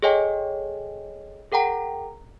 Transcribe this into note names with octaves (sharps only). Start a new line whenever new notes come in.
G#4 A4 C#5 D#5 G5 G#5
G#4 A#4 F#5 G5 A#5